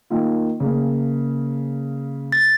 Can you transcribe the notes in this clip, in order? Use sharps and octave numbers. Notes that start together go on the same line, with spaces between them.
D#3 A#3 F4
C#3 A#3
A6